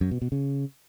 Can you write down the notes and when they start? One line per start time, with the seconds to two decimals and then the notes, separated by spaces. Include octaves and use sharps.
0.01 F#2
0.11 B2
0.22 B2
0.32 C#3